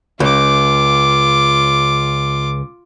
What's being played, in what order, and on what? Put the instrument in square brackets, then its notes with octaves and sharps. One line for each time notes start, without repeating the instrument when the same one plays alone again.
[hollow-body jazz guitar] C#2 [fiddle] F4 D6